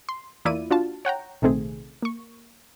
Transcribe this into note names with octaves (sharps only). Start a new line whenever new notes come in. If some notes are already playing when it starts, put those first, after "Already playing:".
C6
E2 A#3 E4 F4 D5 D#7
D4 F4 F#4 A5
C#5 F#5 G5 A#5
A#1 C3 D#3 A3 C4 G#4
A#3 C#6